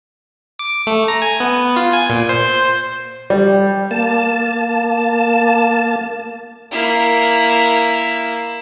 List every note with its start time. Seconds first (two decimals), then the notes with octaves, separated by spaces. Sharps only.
0.59 D6
0.87 A3
1.08 A#5
1.22 G#5
1.40 B3
1.76 F4
1.93 G#5
2.10 A#2
2.29 C5
3.30 G3
3.91 A#3 A5
6.71 A#3 E4